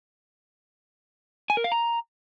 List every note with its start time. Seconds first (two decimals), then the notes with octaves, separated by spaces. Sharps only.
1.50 G#5
1.57 A#4
1.64 F5
1.72 A#5